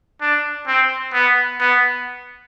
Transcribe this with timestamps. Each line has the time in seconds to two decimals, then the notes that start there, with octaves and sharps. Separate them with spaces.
0.21 D4
0.67 C4
1.13 B3
1.60 B3